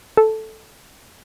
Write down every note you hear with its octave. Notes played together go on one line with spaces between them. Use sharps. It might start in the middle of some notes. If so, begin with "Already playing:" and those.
A4